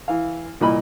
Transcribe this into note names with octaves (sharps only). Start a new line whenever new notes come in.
E3 F5
C2 A#2 E3 D#5 B5